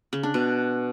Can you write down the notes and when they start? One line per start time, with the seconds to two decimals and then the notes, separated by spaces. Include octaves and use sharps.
0.13 C#3
0.23 D4
0.34 B2